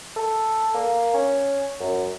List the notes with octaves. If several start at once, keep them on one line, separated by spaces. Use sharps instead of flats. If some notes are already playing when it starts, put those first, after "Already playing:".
A4
A#3
C#4
F#2